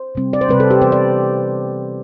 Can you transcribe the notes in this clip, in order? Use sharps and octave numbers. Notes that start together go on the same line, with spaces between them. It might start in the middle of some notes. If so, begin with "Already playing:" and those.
Already playing: C5
C3 G3 C4
D5
C5
C3 G3 C4 B4
A4
G4
E3 B3 C5
D5